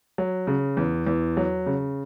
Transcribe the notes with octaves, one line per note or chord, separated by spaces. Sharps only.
F#3
C#3
E2
E2
F#3
C#3